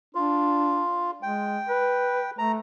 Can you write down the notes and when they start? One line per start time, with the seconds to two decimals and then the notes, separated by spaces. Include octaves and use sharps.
0.15 D4 F4
1.23 G#3 G5
1.69 B4
2.38 A3 A#5